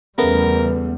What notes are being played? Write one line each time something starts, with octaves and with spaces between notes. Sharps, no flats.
E2 C#3 G3 A3 B3 A#4